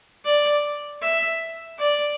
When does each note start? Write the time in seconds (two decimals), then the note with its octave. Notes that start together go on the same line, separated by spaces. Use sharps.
0.25 D5
1.02 E5
1.78 D5